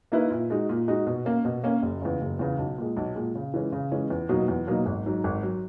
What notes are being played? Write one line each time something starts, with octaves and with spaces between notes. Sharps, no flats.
D#3 A#3 E4 B4
A#2
G#3 D#4 F#4
A#2
G#3 D#4 F#4
B2
A#3 C#4
B2
A#3 C#4
F#1
E2 C#3
F#1
E2 C#3
B1
A#2 G#3
B1
A#2 G#3
C#3
E3 G#3 C#4
C#3
E3 G#3 C#4
E2
B2 F#3 A#3 D#4
E2
B2 F#3 A#3 D#4
G#1
G#2 F#3
G#1
F#3